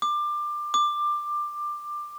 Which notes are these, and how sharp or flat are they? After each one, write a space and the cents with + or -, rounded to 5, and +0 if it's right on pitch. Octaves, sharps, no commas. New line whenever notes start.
D6 +20
D6 +15